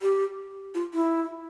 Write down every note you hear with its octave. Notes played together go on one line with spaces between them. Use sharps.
G4
F4
E4